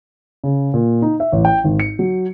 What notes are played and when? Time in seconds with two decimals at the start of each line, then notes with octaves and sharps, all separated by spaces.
0.44 C#3
0.74 A#2
1.02 D#4
1.20 E5
1.32 A1
1.45 G5
1.64 G#1
1.80 C#7
1.99 F#3